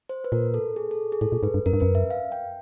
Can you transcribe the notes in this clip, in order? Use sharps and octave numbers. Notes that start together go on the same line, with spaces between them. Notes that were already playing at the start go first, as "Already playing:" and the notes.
C5
B4
A#2 A#4
A4
G#4
A4
G#4
A2 A4
A#2
G#2 B4
G2
F#2 A#4
G2
F#2 B4
E5
F5
G5